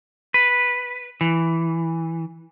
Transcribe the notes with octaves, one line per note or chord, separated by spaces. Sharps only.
B4
E3